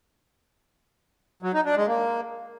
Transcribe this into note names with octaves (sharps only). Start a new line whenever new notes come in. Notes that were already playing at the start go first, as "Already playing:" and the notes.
F#3
D#4
D4
G#3
A#3